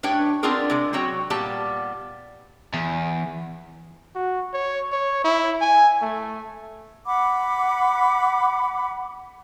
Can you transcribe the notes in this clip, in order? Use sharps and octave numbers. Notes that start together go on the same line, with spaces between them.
A2 D4 G4 B4 C#5 G5
B3 C4 D4 F4 G#4 A#4
C3 G#3
F#3 C4 F#4 C#5 G5
A#2 G3 B3 G4 A5
E2
F#4
C#5
C#5
E4
G#5
A3
F#5 B5 D6